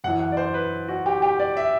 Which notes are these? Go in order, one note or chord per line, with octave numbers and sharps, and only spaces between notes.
F#2 E3 F#5
F#5
D5
C5
B4
F#4
G4
G4
D5
E5